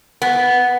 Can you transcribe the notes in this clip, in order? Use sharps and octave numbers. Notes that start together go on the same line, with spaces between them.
B3